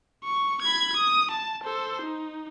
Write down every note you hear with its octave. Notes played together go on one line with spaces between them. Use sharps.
C#6
B5 G#6
D#6
A5
A4 C5
D#4